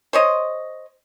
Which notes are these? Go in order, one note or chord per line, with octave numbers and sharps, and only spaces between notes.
C5 C#5 D#5